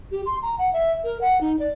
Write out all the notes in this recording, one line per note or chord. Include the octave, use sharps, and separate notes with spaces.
G4
C6
A#5
F#5
E5
A#4
F#5
D#4
D5